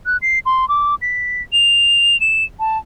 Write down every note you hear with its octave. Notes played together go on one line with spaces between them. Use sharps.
F#6
C7
C6
D6
B6
F7
E7
A5